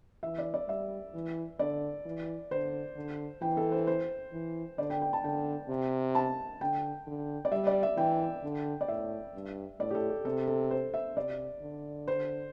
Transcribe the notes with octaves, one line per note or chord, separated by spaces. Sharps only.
E3 E5
D5
D5
G3 E5
E3
D3 D5
E3
D3 C5
D3
E3 G5
A4
C5
C5
E3
D3 D5
G5
G5
A5
D3 G5
C3
A5
D3 G5
D3
D5
G3 E5
D5
E5
E3 G5
D3
D5
A2 E5
G2
A2 D5
G4
A4
G4
C3 A4
A4
C5
E5
C3 D5
D3
C5